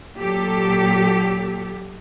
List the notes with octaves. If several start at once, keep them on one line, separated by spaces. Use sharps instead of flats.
A#2 F#3 G4 A4